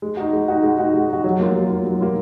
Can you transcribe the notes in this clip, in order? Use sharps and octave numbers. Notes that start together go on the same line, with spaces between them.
G#3
D#4 F#4
G#3
D#4 F#4
G#3
D#4 F#4
G#3
D#4 F#4
F#3
A#3 F4
F#3
A#3 F4
F#3
A#3 F4